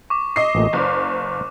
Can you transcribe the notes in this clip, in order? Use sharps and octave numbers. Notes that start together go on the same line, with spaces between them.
C#6 D6
D#5 C7
A1 A#2 A3
F#1 B4 C5 D5